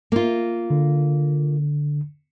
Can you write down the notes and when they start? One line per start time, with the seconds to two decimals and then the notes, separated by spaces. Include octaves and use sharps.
0.12 A#3 F4
0.70 D3